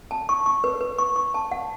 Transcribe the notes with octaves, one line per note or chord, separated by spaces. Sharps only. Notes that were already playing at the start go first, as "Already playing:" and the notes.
A5
C#6
C#6
B4
B4
C#6
C#6
A5
F#5